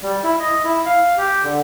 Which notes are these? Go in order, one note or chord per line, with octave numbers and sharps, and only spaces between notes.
G3
E4
D#5
E4
F5
G4
D3